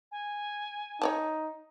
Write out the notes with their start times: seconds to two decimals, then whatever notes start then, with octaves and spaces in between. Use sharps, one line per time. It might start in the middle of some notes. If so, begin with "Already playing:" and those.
0.12 G#5
1.02 D#4 C#5 D5 A5